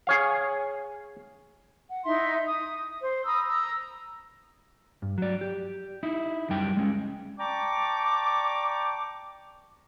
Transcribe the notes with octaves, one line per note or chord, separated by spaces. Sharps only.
G#4 C#5 F5
F#5
D#4 E4 E5 C6
D#6
C5
A#5 B5 D#6 E6
A#5 E6
G2
F#3 D5
G4
D#4 E4
C#2 F#2 G3 G5
G#3 C#4
D5 G5 A5 A#5 C#6 D6